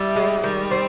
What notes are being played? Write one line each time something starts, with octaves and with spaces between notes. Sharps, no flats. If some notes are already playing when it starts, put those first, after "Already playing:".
Already playing: G3 E4
G#3
D#3 G3
C4